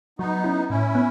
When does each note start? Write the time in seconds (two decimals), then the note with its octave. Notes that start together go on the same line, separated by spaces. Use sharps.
0.19 F#3 B3 D#4
0.44 C#4 E4
0.69 A2 C#4 E4
0.95 B3